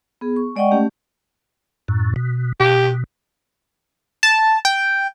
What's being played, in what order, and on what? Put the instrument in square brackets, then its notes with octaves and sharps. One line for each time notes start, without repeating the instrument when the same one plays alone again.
[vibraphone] B3 G#4
C#6
G#3 D5 D#5 F#5 G5 C#6
A3 C#4 G4
[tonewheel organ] F#2 A2
B2
[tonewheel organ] B2 [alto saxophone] G4
[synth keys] A5
G5